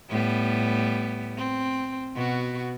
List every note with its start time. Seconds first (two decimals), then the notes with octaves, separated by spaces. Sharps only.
0.10 A2 G3 B3
1.37 C4
2.16 B2 F#4